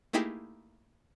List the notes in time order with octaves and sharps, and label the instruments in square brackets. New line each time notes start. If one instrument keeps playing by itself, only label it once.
[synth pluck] A3 A#3 D#4 E4 G4 G#4